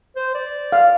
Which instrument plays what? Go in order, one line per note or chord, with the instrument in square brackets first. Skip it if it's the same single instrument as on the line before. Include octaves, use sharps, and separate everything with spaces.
[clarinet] C5
D5
[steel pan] F5